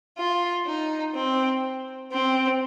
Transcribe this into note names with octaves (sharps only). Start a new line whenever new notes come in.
F4
D#4
C4
C4